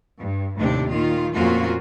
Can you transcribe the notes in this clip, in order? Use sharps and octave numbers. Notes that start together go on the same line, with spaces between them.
G2
D#2 A2 C3 D4
A#2 D#3 F4
F2 A#2 A#3 C#4 F4 F#4